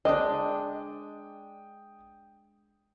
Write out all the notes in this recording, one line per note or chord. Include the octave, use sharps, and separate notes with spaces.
G#3 D4 D#5 G5 D#6